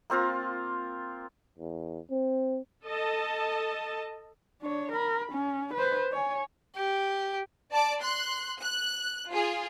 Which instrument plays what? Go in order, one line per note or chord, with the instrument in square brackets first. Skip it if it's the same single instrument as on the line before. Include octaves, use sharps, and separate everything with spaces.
[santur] A#3 C4 F4 A#4
[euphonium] E2
C4
[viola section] A4 D#5 A5
[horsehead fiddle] D4 C#5
A#4 B5
C#4
B4 C5
C#5 G#5
[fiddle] G4
[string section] D5 A5 D6
C6 F#6
F#6
F4 G#4